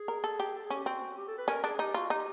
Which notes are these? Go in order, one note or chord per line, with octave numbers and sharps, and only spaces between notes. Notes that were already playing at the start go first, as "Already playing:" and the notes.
Already playing: G#4
A#4
A4
G4
A4
C#4 G#4
G4
C4 F#4
G4
A4
B4
C#4 A#4
D4 G#4
D#4 G4
F4 F#4
D#4 G4